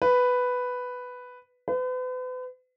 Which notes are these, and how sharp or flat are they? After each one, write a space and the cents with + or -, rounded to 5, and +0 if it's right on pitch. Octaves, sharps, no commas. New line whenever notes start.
B4 +5
B4 +40